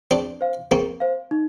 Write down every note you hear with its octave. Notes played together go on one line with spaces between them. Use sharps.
C4 D4 G#4
C5 F5
A#3 C4 G#4
C5 F5
D#4